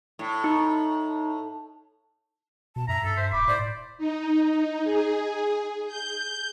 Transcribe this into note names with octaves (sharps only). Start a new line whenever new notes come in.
A2
D#4
B2 A5
F#2 E5 A#5
G2 A4
C5
D#1 B5 D6
A2 C5 D5
D#4
G#4
G6